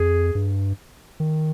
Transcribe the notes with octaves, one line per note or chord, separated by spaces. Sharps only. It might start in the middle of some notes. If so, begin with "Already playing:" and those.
Already playing: F2 G#4
G2
D#3